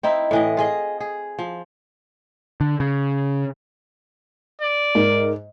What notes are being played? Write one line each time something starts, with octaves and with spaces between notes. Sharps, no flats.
C4 D#4 E4
A2 E3 D#5
F4 G#4 D#5
G#4
F3
D3
C#3
D5
G#2 A#4